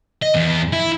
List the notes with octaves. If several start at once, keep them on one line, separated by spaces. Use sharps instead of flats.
D#5
E2
E4